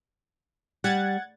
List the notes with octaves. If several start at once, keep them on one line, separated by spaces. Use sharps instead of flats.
G3 F#5 G#6 A6